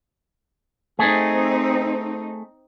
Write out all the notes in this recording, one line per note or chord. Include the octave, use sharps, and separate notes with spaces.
A3 C4 D#4 G#4